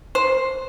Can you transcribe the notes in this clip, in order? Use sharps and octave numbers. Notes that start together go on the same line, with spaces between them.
C5